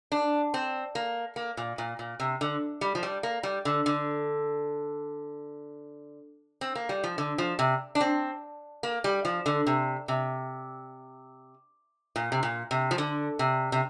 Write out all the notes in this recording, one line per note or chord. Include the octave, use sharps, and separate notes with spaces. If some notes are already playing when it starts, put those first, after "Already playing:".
D4
C4
A#3
A#3
A#2
A#2
A#2
C3
D3
G3
F3
G3
A#3
G3
D3
D3
C4
A#3
G3
F3
D3
F3
C3
D4
C4
A#3
G3
F3
D3
C3
C3
A#2
C3
A#2
C3
F3
D3
C3
C3